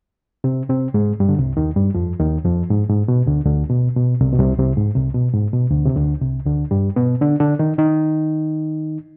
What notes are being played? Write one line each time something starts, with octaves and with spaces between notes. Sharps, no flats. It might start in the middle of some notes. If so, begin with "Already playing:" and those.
C3 C4
C3 C4
G#2 G#3
G2 G3
D3
C2 C3
D#2 D#3
G2 G3
F2 F3
D#2 D#3
F2 F3
G#2
G#2
B2
D2 D3
D2 D3
B2
B2
C2 C3
B2
C2 C3
C2 C3
G#2
C2 C3
B2
G#2
B2
D2 D3
C3
D2 D3
C2 C3
D2 D3
G2 G3
B2 B3
D3 D4
D3 D4
D#3 D#4
D#3 D#4